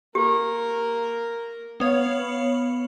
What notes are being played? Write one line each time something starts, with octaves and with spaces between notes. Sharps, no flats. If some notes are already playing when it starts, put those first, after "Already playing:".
A#3 G4 A#4
B3 C#5 F5